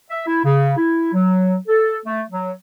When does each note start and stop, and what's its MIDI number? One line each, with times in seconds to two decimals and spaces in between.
0.10 0.23 76
0.27 0.43 64
0.44 0.75 49
0.77 1.10 64
1.13 1.56 54
1.68 1.98 69
2.06 2.23 57
2.31 2.52 54